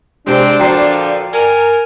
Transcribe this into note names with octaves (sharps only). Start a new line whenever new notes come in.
C3 G#3 C4 D4
A#2 D3 F3 F#4 D5 G5 A#5 C7
A#4 G#5